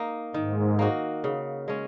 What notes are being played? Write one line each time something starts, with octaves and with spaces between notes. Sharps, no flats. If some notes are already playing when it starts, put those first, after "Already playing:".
Already playing: A#3 D#4
G#2 D#3
A#3 D#4 F#4
C#3
G#3 C#4